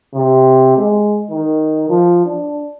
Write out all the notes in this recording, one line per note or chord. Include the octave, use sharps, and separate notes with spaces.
C3
G#3
D#3
F3
D4